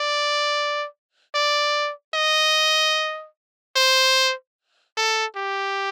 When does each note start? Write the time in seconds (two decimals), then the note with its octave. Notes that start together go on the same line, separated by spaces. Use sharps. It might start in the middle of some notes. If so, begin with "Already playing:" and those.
Already playing: D5
1.35 D5
2.14 D#5
3.76 C5
4.97 A4
5.37 G4